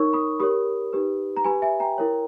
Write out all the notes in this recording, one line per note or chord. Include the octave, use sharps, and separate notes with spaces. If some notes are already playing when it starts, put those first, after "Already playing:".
Already playing: D#4 A#4 C#5 C#6 E6
B5 D#6
G4 A#4 C#5 B5 D#6
D#4 G4 B4
A#5
G4 B4 G#5 B5
E5 G#5
G5 A#5
E4 A#4 C#5